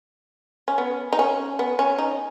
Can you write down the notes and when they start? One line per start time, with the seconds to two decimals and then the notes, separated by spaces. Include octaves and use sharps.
0.68 C#4
0.78 B3
1.13 D#4
1.19 C#4
1.59 B3
1.79 C#4
1.98 D#4